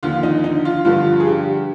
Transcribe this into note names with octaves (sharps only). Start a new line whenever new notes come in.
D#2 D3 F3 F4
D#4
D#4
F4
G2 D3 F3 F4
G#4
G4